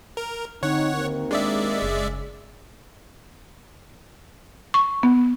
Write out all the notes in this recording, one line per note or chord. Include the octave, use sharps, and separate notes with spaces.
A#4
D3 C4 D#4 C#5 F#5
D#2 C4 A#4
G#3 D4 D5 E5
F#1 C#3 G#4
C#6
B3